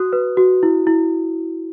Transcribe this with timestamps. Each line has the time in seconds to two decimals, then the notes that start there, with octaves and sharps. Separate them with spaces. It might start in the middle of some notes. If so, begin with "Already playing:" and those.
Already playing: F#4 D#6 F#6
0.13 B4
0.37 F#4
0.63 E4
0.87 E4